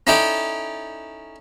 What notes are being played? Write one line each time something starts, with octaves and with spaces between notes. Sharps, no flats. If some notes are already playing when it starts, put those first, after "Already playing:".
C#4 D#4 E4 A4 D5 G5